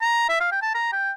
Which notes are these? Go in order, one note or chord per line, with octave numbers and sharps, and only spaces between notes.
A#5
E5
F5
G5
A5
A#5
G5